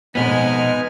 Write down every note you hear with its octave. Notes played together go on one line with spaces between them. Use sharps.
F2 B2 G#3 B3 D#4 G#5 F6